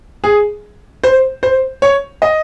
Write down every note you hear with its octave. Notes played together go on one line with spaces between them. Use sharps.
G#4
C5
C5
C#5
D#5